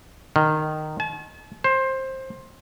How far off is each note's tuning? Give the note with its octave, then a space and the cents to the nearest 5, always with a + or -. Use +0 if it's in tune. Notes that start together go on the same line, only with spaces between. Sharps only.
D#3 -15
A5 -40
C5 +15